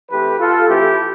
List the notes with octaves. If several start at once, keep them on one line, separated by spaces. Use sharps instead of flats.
E3 A3 C4 G4 B4
F4 A4
E3 A3 C4 E4 G4